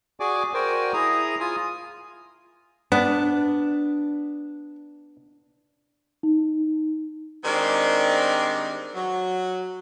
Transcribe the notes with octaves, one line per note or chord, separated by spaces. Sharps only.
F#4 G#4 D5 G#5 D6
F#4 A#4 C5 D5 G5 G#5
E4 G#4 A#5 D#6
F4 G#5 D#6
B3 D4
D#4
D#3 G3 G#3 C4 D4
F#3